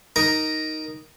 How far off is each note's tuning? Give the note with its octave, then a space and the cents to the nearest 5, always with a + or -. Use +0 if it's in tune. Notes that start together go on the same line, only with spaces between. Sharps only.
D#4 +0 A#4 +0